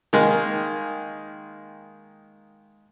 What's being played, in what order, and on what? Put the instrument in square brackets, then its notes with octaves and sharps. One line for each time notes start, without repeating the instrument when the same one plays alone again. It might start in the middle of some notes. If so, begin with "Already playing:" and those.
[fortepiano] D#3 G#3 A#3